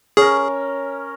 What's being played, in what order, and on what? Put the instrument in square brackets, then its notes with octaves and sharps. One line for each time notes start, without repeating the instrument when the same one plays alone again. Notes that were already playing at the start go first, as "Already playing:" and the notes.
[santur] C#4 A#4 [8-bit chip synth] G#4